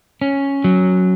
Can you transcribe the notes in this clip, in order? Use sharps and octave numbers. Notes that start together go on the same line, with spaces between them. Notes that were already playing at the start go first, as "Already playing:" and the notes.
C#4
F#3